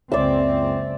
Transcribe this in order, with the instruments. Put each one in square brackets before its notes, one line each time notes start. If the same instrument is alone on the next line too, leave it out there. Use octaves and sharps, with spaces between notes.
[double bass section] F#1 C#2 C4 [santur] D5 E5